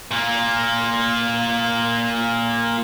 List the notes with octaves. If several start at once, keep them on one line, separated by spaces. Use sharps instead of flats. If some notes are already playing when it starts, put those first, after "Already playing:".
A#2 A#3